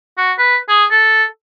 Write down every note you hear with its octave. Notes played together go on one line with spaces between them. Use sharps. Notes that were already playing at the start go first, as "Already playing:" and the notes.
F#4
B4
G#4
A4